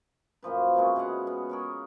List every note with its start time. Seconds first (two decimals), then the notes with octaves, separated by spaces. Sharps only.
0.42 F#2 A#2 F3 B4
0.76 C3 E3 G#3 C#4
0.96 B2 G#4 F5 F#5
1.27 B3
1.50 G#4 A#4 C#5